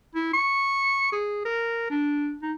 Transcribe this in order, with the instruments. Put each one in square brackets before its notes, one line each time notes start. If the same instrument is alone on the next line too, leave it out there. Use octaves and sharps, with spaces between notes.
[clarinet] E4
C#6
G#4
A#4
D4
D#4